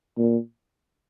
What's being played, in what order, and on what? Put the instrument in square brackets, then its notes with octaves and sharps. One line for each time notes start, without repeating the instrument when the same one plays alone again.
[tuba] A#2